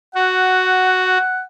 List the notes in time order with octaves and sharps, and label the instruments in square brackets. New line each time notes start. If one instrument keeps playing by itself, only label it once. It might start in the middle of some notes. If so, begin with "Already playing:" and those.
[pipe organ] F#4 [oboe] F#5